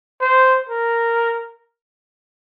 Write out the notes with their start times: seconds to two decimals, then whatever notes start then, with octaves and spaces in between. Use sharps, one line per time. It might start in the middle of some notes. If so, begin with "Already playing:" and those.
0.21 C5
0.69 A#4